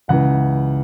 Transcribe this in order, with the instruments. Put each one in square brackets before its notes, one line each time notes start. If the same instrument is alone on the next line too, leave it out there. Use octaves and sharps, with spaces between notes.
[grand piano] C#2 C#3 E3 F#5